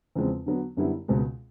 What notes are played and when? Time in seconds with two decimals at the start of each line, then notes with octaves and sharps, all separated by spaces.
0.16 E2 C#3 F3 G#3 C4
0.46 D3 F#3 B3
0.77 F#2 D3 G3 B3 E4
1.08 C#2 B2 G#3